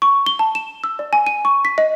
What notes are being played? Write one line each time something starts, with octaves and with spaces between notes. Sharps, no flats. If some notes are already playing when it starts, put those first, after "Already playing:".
C#6
G7
A5
E7
E6
D5
G#5
D#7
C#6
B6
D#5